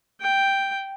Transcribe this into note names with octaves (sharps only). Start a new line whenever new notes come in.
G5